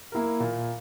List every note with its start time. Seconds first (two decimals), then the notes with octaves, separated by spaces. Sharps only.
0.12 A#3 E4 A#4
0.40 A#2